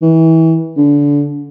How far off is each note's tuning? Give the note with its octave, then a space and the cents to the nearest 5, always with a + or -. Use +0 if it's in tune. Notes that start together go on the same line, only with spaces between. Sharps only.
E3 -25
D3 -25